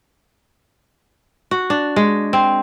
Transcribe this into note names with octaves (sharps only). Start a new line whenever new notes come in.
F#4
D4
G#3
C4